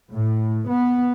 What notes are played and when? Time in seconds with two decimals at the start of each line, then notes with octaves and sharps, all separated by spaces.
0.12 A2
0.68 B3